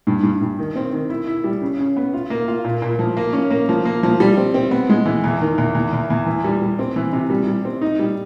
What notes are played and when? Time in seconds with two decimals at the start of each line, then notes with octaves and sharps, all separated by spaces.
0.07 G2
0.23 G2
0.41 G2
0.59 D#3
0.76 C4
0.92 D#3
1.10 E4
1.27 E4
1.44 G3
1.62 C#3
1.79 C#3
1.97 B3
2.14 F4
2.30 A#3
2.48 F4
2.64 A#2
2.82 A#2
2.99 F3
3.17 A#3
3.33 C#4
3.50 A#3
3.69 F3
3.85 A#3
4.03 F3
4.20 G3
4.37 C4
4.54 C4
4.71 B3
4.89 G#3
5.06 E3
5.24 E2
5.41 D#3
5.58 E2
5.75 E2
5.93 E2
6.10 E2
6.26 E3
6.45 G3
6.62 G3
6.79 C4
6.96 E3
7.13 C3
7.30 G3
7.47 G3
7.65 C4
7.82 D#4
7.99 G3